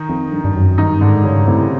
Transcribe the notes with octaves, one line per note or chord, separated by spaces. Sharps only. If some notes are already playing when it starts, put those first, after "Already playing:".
Already playing: D#3 D#4
F2
G2
G2
F#2
G2 D#3 D#4
G#2 D3 D4
G2 C#3 C#4
A2 C3 C4